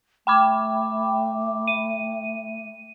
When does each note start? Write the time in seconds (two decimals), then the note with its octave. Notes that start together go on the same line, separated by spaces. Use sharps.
0.27 A3 G5 B5 D6
1.67 D#7